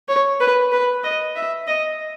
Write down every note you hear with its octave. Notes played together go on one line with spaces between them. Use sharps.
C#5
B4
B4
D#5
E5
D#5